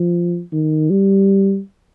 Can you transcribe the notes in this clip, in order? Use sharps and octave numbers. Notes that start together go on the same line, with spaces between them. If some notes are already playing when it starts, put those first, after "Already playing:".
Already playing: F3
D#3
G3